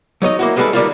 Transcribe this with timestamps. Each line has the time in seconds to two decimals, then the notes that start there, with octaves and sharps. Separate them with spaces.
0.22 F#3 D#4 C#5 D#5
0.39 A#3 E4 F#4
0.56 G3 G#3 G#4 A4 B4
0.73 D#3 G3 A#3 F4